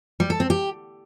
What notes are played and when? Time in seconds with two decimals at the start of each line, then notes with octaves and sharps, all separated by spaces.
0.20 G3
0.30 A4
0.40 C4
0.50 G4